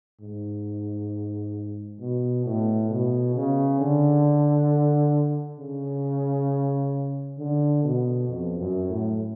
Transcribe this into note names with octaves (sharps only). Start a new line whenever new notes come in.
G#2
B2
A2
B2
C#3
D3
C#3
D3
B2
F2
F#2
A2